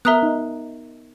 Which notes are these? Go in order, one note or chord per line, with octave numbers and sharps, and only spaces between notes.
B3 A#4 E5 A#5 D#6 F#6
D#4